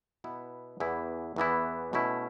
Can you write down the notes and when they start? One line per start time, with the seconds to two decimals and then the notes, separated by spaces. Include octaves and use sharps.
0.24 B2 B3 E4
0.80 E2 E3 B3 E4
1.36 E2 E3 B3 E4
1.93 B2 A3 C#4 E4